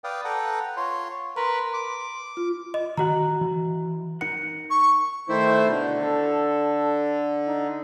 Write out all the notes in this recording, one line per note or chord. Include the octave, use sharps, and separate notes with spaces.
B4 D5 F5 G5 D#6
A4 B4 F#5 G5 A#5
F4 C#5 C6
A#4 B4 C6
D6
F4
D#5
D#3 F#4 F#5 A#5
E3
D#4 A#4 F#5 C#7
C#6
D#3 A3 E4 C5
B2 D3
A4
D#4